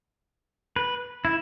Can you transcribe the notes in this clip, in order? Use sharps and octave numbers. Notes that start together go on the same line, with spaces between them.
B4
E4